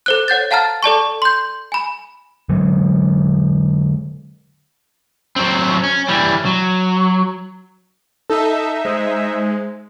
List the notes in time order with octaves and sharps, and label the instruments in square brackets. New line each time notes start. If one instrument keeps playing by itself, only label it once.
[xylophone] A4 C5 F#6
C#5 F#5 G6 A6
F5 F#5 A5 A#5 F6 A6
A4 D5 A5 C#6
C6 G6
G#5 B5
[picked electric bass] D3 F#3 G#3
[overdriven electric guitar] F#3 C4
C#4
E3 G3
F#3
[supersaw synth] D#4 E5 [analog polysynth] A4
[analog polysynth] G#3 [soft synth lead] C5